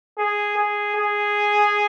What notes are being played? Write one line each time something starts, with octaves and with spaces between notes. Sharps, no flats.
G#4
G#4
G#4